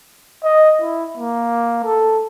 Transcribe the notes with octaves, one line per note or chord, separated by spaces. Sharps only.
D#5
E4
A#3
A4